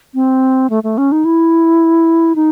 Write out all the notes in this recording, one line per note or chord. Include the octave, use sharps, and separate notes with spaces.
C4
A3
A3
C#4
D#4
E4
D#4